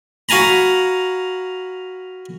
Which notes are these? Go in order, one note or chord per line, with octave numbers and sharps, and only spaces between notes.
F#4 F5 G#5 A#5 B5